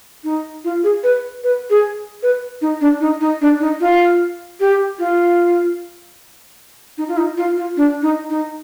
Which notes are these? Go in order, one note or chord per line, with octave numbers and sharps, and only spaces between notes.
D#4
F4
G#4
B4
B4
G#4
B4
D#4
D4
D#4
D#4
D4
D#4
F4
G4
F4
D#4
F4
D#4
F4
F4
D4
D#4
D#4